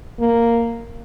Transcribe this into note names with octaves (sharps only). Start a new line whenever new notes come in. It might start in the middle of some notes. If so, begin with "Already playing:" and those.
A#3